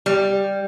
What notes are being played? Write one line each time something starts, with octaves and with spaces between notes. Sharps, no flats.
G3